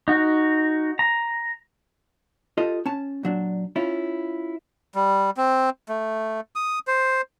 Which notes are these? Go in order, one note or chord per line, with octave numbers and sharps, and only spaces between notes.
D#4 F#4
A#5
F4 G4 A4 D#5
C#4 A5
A#2 F#3 D4
C#4 E4 F4
G3
C4
A3
D#6
C5